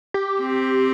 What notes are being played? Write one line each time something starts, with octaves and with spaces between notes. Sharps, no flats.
G4
C4